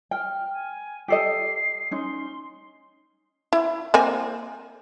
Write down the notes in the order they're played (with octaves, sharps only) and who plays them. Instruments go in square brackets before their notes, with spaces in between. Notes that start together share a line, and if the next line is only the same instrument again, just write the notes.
[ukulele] G5 [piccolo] F6
[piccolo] G#5
[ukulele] G4 A4 D#5 [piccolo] C7
[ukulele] C#4 D#4 [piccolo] C6
[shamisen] E4
A#3 C4 G#5